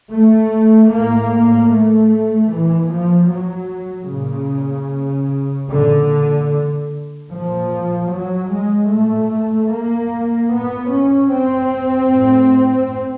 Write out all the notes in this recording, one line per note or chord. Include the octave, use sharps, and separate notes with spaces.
A3
A2 A#3
A3
A#2 E3
F3
F#3
A#2 C#3
A#2 D3
A#2 F3
F#3
G#3
A#2 A3
A#3
A#2 B3
C#4
C4
A2